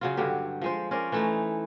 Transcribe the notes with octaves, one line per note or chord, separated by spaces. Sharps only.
C#3 F#3 F4
G2 D3 F#3 G4
F3 G#3 C5
C#4 A#4 C5 D5
E3 A3 D#4